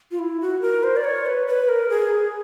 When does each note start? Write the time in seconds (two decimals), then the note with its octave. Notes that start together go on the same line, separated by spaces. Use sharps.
0.11 F4
0.19 E4
0.41 F#4
0.62 A#4
0.84 C5
0.96 D5
1.04 C#5
1.26 B4
1.47 B4
1.69 A#4
1.90 G#4